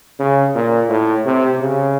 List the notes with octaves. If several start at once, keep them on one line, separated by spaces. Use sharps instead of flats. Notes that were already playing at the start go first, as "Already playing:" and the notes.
C#3
A#2
A2
C3
C#3